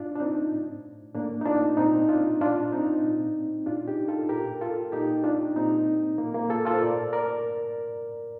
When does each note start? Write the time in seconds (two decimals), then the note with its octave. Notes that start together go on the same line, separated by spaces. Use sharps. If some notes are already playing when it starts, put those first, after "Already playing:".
Already playing: A2 D4 F4
0.15 D4
0.20 C4 D#4
0.52 A2
1.15 A2 A#3 D4
1.41 D#4
1.46 D4 F4
1.77 A#2 C4 D#4
2.09 D4 F4
2.41 A2 D4 F4
2.72 C4 D#4
3.04 A#2
3.66 A2 D4 F4
3.88 D#4 G4
4.08 F4 A4
4.29 A#2 G4 A#4
4.61 F4 A4
4.92 A#2 D#4 G4
5.24 D4 F4
5.56 A#2 C4 D#4
6.18 A#2 A#3
6.34 A#3
6.50 F4 A4
6.65 F4 A4
6.74 C5
6.82 A2 A#4 D5
7.13 A#4 D5